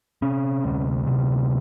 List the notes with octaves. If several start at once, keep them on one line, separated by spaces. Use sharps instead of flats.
C3 C#4
D2
C3